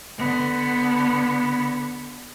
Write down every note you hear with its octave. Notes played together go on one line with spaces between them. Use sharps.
D3 B3